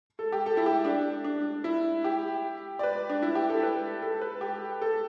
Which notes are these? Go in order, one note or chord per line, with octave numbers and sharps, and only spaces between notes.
A4
G4
A4
E4
G4
D4
D4
E4
G4
D5
B4
D4
E4
G4
A4
B4
A4
B4
G4
A4